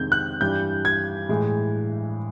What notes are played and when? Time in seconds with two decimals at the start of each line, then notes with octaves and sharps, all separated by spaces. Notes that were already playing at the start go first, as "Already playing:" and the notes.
Already playing: F2 C3 D#3 G#3 G6
0.12 F#6
0.41 G2 E3 G3 G6
0.85 G#6
1.29 A2 E3 G#3